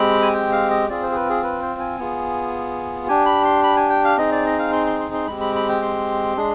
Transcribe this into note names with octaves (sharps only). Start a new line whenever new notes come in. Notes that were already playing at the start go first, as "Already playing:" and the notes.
Already playing: G#3 C4 G4 B5
G#5
G5
F5
D#5
C4 F4 G#4 D5
C5
G#4
B4
G#4
B4
C5
G#5
B3 F4 G#4
D4 G4 G#5
B5
C6
B5
G#5
G5
F5
C4 D#4 G#4 D#5
D5
D#5
F5
C6
C6
C6
C6
G#3 C4 G4 B5
B5
B5
G5
C6
G#3 D4 G#4